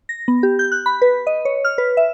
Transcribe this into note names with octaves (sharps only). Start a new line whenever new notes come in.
A#6
B3
G4
G6
F#6
B5
B4
D#5
C#5
F6
B4
E5